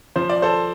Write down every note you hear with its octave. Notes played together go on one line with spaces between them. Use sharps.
F3 C5
D5
A4 C5